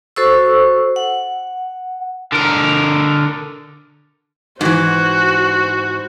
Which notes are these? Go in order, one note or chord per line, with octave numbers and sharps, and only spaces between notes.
F#4 A4 C5 C#6 E6
F#5
D3 A#4
G#2 E3 F#4 C5